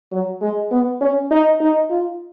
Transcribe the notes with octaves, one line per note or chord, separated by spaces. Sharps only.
F#3
G#3
B3
C#4
D#4
D#4
F4